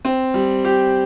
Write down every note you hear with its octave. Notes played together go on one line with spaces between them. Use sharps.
C4
G3
G4